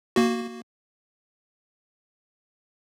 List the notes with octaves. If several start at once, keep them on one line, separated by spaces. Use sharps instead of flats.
A#3 F#4